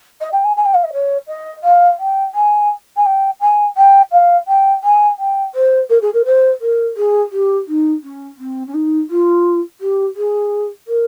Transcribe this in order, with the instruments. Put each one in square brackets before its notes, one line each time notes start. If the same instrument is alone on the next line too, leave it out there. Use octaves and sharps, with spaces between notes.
[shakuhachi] D#5
G5
G#5
G#5
G5
F5
D#5
C#5
D#5
F5
G5
G#5
G#5
G5
G#5
G5
F5
G5
G#5
G5
C5
A#4
G#4
A#4
C5
A#4
G#4
G4
D#4
C#4
C4
C#4
D#4
F4
G4
G#4
A#4